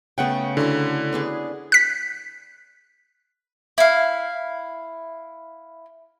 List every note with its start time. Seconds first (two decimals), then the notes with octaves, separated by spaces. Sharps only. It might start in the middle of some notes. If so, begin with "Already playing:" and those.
0.18 C#3 A3 B3 G#4 F#5 G5
0.57 D3 E4 F#4 A4
1.13 B3 D4 G#4
1.72 F#6 B6
3.78 E4 F5